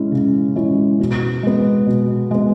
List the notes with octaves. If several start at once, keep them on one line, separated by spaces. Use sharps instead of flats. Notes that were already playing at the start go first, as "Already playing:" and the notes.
Already playing: G#3 C#4 E4
C#3
G#3 C#4 E4
B2
G#3 B3
B2
G#3 B3